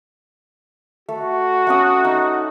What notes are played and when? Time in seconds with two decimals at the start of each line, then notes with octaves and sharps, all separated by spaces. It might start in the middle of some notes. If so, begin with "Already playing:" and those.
1.09 A3 F#4
1.67 A3 C#4 D#6
2.05 D#4